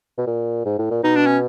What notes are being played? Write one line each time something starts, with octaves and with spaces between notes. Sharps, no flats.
B2
A#2
G#2
A2
A#2
B2 D#4
D4
C#4